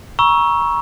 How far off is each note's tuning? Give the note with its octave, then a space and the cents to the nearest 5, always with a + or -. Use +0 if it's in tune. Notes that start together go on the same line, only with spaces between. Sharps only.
A#5 +35 C#6 +0 E6 +0